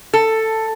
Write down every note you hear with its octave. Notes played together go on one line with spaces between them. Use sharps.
A4